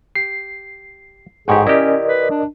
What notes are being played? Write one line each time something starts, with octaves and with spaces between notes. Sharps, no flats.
G4 C7
A1 G#2 G4 G#4 F#5 G5 C#6
C#4 E4 G4 A#4 D5 D#5
B4
D4